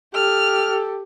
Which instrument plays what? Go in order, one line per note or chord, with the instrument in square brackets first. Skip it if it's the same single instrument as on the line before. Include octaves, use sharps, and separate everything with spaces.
[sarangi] G4 [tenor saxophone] A4 [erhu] F6